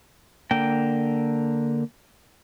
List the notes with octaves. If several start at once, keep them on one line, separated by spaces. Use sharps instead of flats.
D3 A#3 G5